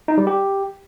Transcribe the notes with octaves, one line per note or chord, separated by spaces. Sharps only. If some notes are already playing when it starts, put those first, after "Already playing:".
D#4
G3
G4